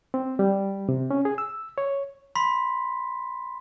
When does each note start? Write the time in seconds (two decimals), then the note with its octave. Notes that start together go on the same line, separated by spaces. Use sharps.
0.14 C4
0.39 G3
0.89 C3
1.11 C#4
1.25 G#4
1.38 E6
1.78 C#5
2.35 B5 C6 B6